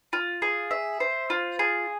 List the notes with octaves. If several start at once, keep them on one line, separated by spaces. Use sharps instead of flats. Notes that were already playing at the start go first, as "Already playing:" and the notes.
F4
G#4
E5
C5
F4
G#4